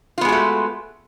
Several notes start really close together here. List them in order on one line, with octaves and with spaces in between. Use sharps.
F4 B3 G#3 F#4 A3